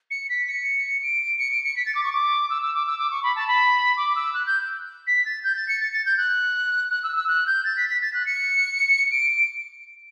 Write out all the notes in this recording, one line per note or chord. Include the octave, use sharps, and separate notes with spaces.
C#7
B6
C#7
D7
C#7
D7
C#7
B6
A6
D6
C#6
D6
E6
E6
D6
E6
D6
C#6
B5
A5
B5
D6
E6
F#6
G6
B6
A6
G6
A6
C#7
A6
A6
G6
F#6
F#6
E6
E6
F#6
G6
A6
B6
B6
A6
F#6
C#7
D7